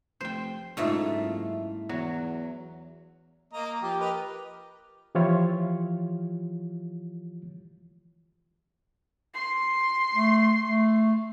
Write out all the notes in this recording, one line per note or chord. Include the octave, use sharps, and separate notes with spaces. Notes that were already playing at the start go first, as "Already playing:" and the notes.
F1 C5 G5
F#1 G#2 A3 E4 F4 E5
E2 F#3
A#3 D#5 A#5
F3 G4
A#4 B4 D#5
E3 F3 E4 F4 G4 C#5
C6
A3
A3